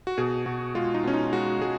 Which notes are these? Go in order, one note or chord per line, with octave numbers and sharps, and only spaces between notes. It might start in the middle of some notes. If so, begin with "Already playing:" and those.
F#4
B2 G#4
B2 F#4
G#3 F4
D#4
B2 C#4
D#4
G#3 F#4
G#3 G#4